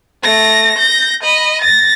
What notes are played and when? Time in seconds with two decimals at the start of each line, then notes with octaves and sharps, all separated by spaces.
0.23 A3 A#6
0.78 G6 A#6
1.23 D#5 B5
1.61 A6 A#6